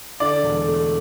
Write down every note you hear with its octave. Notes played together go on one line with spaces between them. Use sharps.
D3 D5
E1
A3